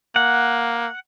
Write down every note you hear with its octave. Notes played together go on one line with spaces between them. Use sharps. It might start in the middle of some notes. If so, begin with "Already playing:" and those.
A#3 F#5